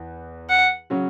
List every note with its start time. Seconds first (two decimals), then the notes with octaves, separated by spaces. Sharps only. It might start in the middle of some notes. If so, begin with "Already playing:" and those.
Already playing: E2 E3 B3
0.49 F#5
0.90 C#3 F#3 C#4 F#4